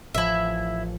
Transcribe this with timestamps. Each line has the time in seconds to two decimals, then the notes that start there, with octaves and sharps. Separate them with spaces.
0.15 A1 F3 E4 E5